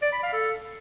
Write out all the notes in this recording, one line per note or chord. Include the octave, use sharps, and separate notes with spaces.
D5
B5
F5
A4